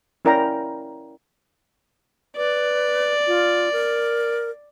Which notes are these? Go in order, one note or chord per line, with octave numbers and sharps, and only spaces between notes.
C#4 E4 A#4 D5 G5 A#5
B4 D5
F4
A#4